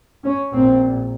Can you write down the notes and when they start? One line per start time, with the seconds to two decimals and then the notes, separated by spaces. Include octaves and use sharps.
0.24 C#4
0.52 A#1 A#2 C4